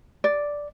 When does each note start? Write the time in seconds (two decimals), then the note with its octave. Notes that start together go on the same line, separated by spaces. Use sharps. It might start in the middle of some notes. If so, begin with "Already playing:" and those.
0.24 D5